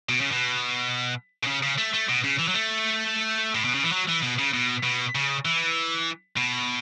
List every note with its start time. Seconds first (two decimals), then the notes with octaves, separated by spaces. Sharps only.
0.09 B2
0.21 C#3
0.32 B2
1.43 B2
1.47 C#3
1.63 C#3
1.78 A3
1.94 A3
2.09 B2
2.24 C#3
2.39 E3
2.48 F#3
2.54 A3
3.55 A2
3.64 B2
3.74 C#3
3.83 E3
3.92 F#3
4.08 E3
4.22 B2
4.39 C#3
4.54 B2
4.83 B2
5.15 C#3
5.45 E3
6.37 B2